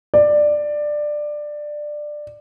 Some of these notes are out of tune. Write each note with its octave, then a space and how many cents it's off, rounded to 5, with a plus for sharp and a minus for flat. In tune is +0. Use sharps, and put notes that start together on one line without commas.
D5 +15